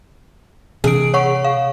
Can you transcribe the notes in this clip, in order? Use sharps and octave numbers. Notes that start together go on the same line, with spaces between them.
C3 E3 G#4 D7
C#5 F#5 C#6
F5